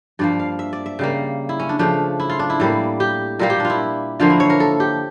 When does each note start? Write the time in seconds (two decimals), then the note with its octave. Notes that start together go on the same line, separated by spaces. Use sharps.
0.19 G2 F3 A#3 D5
0.39 F5
0.59 E5
0.73 D5
0.86 E5
0.99 C#3 G3 A#3
1.49 E4
1.59 C#4
1.69 D4
1.79 C#3 F3 A3 D4
2.20 E4
2.30 F4
2.39 D4
2.50 E4
2.60 A2 G3 A#3
3.00 G4
3.39 A#2 G3 A#3 A#4
3.50 G4
3.60 D4 F4
3.70 E4
4.19 D3 F3 A#3 F4
4.30 E4
4.40 C#5
4.50 A#4
4.60 A4
4.80 G4